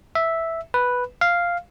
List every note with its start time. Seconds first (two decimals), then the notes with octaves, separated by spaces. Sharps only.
0.15 E5
0.74 B4
1.21 F5